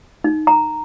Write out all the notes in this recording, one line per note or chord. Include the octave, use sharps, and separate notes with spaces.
D#4
A#5